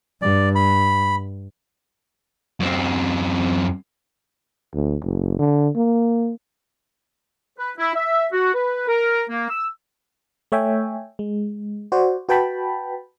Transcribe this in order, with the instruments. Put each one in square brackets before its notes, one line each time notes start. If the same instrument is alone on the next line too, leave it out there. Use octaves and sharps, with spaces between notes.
[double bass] G2 [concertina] D5
[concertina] B5
[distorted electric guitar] F#2 C4
[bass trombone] D2
F#1
D3
A#3
[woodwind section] B4
E4
E5
F#4
B4
A#4
A#3
E6
[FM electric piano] A3 C#5 E5 G5 G#5
G#3
F#4 C5 D5
F#4 B4 G5 A5 B5